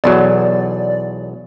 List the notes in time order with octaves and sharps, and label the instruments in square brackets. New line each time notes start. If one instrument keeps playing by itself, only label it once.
[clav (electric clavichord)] B1 E2 F#3 [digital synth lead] D5